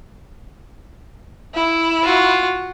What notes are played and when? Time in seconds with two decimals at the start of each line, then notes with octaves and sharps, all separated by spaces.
1.54 E4
2.03 F4 F#4